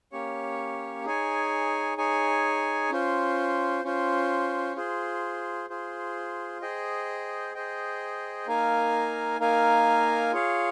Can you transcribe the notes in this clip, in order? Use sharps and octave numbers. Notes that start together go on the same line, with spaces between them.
A#3 C#4 G4 C#5
D#4 G#4 C#5 G#5
D#4 G#4 C#5 G#5
C#4 F4 C5
C#4 F4 C5
F4 G#4 C5
F4 G#4 C5
G#4 C5 D#5 G5
G#4 C5 D#5 G5
A#3 D#4 A#4 F5 G#5
A#3 D#4 A#4 F5 G#5
F4 G#4 C#5 F5